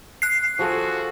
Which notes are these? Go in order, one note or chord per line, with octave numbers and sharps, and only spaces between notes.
F#6 C7
F3 F#4 G#4 A4